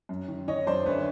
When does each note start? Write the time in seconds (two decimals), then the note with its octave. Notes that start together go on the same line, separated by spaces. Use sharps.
0.09 F#2
0.28 D#3
0.48 D#3 C#5 D#5
0.67 F#2 C5 D5
0.86 D2 B4 C#5